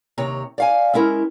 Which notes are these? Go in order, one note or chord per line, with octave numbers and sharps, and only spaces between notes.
D#2 C3 C#5 A#5
D5 F5 G#5
G#3 C#4 E4 A#4